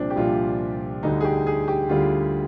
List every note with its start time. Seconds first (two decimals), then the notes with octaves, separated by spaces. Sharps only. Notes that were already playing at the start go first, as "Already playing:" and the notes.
Already playing: C2 A#2 F3 C4 D4
0.10 G4
0.16 C2 A#2 F3 F4
1.03 D2 D3 G3 D#4
1.21 G#4
1.25 G4
1.47 G#4
1.68 G4
1.89 D2 D3 G3 F4